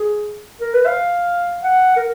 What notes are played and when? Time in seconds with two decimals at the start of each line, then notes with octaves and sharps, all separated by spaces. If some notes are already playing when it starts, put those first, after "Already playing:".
Already playing: G#4
0.61 A#4
0.74 B4
0.86 F5
1.63 F#5
1.96 A#4